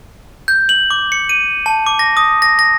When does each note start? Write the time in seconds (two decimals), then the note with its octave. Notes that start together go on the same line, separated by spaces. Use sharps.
0.48 G6
0.69 F#7
0.90 D6
1.12 C#7
1.29 D#7
1.66 A5
1.86 D6
1.99 A#6
2.17 D#6
2.42 A#6
2.59 A#6